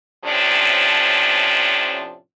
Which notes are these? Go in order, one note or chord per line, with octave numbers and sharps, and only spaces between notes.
A2 C3 F3 C#4 D4